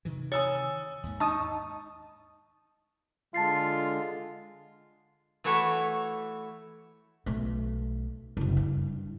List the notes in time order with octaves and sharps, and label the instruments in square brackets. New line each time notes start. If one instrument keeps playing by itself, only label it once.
[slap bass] C3 D#3 E3
[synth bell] C#5 G#5 [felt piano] D#6 E6 A6
[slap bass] D#2 G#2
[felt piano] D#4 [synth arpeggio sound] A5 D#6 [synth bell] C#6
[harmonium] D3 G#3 [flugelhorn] F4 [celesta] A5 A6 C7
[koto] E3 A3 E4 F#4 C#5
[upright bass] B1 A3
F#1 C2
G2